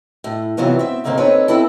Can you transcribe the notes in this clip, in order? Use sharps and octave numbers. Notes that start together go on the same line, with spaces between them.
A2
G2 C3 E3 F#3 B3 F4
C4 E5
D2 G#2 D3 D#3 A#3 C4
C4 D4 D#4 A4 B4 C#5
B3 C4 D4 E4 A4